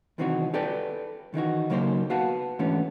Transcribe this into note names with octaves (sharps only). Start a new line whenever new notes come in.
C2 D#3 E3 C4 D#4 F#4
G4 A4 B4 D5 G5
D#3 E3 D#4 F#4
C#3 F#3 A#3 D#4 G4 C5
B3 F#4 F5 F#5 A5 B5
G#2 D3 E3 A3 B3 C#4